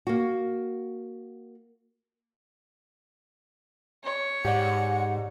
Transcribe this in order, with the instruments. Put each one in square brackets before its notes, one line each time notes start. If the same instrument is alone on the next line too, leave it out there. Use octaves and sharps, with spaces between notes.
[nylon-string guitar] A#3 F#4
[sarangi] C#5
[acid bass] G#2 [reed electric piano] G4 D5 [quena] F#5